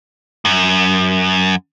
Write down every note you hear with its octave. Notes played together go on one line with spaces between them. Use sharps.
F#2